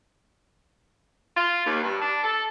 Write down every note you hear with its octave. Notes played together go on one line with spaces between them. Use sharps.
F4
D#2
G2
D4
A4